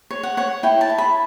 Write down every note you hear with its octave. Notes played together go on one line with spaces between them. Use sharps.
C#5
F#5
C#5 F#5
E4 G5
A5
E4
B5